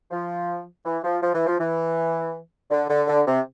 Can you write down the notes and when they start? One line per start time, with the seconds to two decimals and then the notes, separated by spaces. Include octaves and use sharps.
0.11 F3
0.85 E3
1.04 F3
1.22 F3
1.34 E3
1.47 F3
1.60 E3
2.71 D3
2.89 D3
3.08 D3
3.27 C3